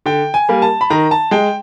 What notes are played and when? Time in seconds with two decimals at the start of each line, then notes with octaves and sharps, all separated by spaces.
0.06 D3 G5
0.34 G#5
0.49 G3 A#3
0.62 A5
0.81 B5
0.90 D#3 A#5
1.11 A5
1.31 G#3 G5